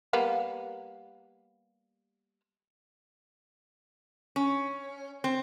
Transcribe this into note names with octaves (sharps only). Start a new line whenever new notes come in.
G3 A#3 B3
C#4
C4